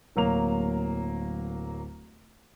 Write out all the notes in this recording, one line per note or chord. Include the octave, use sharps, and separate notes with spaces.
D1 F#3 A#3 F7